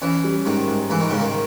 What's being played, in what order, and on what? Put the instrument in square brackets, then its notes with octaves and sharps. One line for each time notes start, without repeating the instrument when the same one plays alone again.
[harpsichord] E3 [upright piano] C#4
[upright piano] G3
[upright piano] G#2 [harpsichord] D#3
[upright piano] G#2
[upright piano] G#2 [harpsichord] E3
[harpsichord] D#3
[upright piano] G#2 [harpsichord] C#3
[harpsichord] D#3